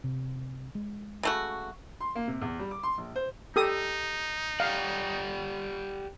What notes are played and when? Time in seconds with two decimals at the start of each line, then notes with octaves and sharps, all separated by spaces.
0.04 C3
0.75 G#3
1.23 C#3 A3 F#4
2.01 C6
2.15 A#3
2.28 C3
2.42 E2
2.59 G3
2.71 D6
2.83 C6
2.98 A#1
3.16 C5
3.56 D#4 G4 A4 D#6
4.60 G4 D5 F5 F#5